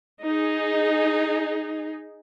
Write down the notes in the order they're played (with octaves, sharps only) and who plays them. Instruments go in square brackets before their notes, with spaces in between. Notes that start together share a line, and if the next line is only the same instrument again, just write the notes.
[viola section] D#4 G#4